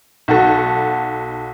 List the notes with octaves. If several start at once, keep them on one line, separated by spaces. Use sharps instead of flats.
B1 F#4 A4